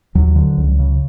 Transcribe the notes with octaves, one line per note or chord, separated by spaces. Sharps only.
D#2 F#3
D3
C#2
C#3